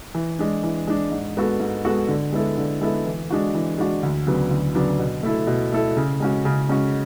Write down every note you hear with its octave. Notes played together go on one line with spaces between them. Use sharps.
E3
G#3 D4
E3
G#3 D4
G#2
G#3 B3 F#4 A4
G#2
G#3 B3 F#4 A4
D3
G#3 B3 E4 A4
D3
G#3 B3 E4 A4
E3
G#3 D4 F#4
E3
G#3 D4 F#4
D2
C#3 F#3 B3 D4
D2
C#3 F#3 B3 D4
B2
A3 E4 A4
B2
A3 E4 A4
C#3
G#3 C#4 F#4
C#3
G#3 C#4 F#4